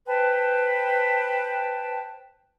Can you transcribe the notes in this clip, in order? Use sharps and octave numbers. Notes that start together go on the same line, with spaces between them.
B4 C5 G5 A5